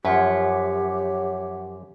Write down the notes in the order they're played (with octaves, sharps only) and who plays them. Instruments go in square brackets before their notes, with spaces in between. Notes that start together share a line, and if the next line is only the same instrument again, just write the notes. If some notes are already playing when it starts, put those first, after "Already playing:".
[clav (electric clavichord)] F#2 F3 [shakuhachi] G4 [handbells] C#5 E5 F#5